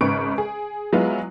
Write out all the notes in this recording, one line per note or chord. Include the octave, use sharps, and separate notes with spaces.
G#1 C#3 B4 C#6 D7
G#4
F#3 G#3 B3 E4 F4